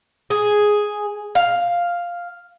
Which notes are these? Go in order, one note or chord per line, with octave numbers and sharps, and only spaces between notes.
G#4
F5